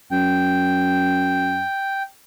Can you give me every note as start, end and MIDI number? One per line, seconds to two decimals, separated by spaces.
0.11 1.65 42
0.11 2.03 79